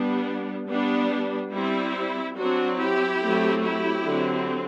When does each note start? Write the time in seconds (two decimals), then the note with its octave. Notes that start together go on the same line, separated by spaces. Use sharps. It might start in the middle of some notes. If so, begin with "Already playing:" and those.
Already playing: G3 B3 D4
0.69 G3 B3 D4
1.52 G3 C4 E4
2.37 F#3 C4 D4 F#4
2.79 E4 G4
3.22 F#3 A3 C4
3.64 E4 G4
4.06 D3 F#3 C4